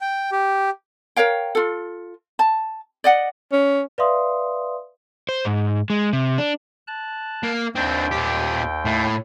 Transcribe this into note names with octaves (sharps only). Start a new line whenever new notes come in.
G5
G4
A#4 C#5 F5 G5
F4 A4
A5
D5 D#5 F#5
C#4
B4 D5 E5 F5 C6 D#6
C5
G#2
G#3
C3
D4
A5 F#6
A#3
D#2 C4 D4 G5
A#2 G4
A2